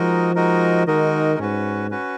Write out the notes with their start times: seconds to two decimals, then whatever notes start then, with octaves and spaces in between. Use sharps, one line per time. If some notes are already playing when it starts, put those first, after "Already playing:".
Already playing: F3 G#3 D#4 F#4 A#4 D#5
0.35 G#3 D#4 F#4 A#4 D#5
0.87 D#3 G#3 D#4 F#4 A#4 D#5
1.39 G#2 C#4 F#4 B4
1.91 C#4 F#4 B4